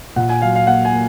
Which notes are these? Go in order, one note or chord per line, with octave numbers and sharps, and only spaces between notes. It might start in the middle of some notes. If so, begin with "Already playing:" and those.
A#2 F#5
G#5
F#3 F5
F5
A#3 F#5
G#5
A#3